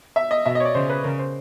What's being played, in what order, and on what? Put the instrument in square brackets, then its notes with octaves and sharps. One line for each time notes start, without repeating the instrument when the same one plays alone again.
[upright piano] E5
D#5
[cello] B2 [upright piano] E5
[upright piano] D#5
C#5
D5
[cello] C#3 [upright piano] C5
[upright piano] B4
[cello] C#3 [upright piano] A#4
[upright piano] C5